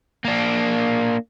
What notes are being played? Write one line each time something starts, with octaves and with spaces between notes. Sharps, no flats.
A#3 D4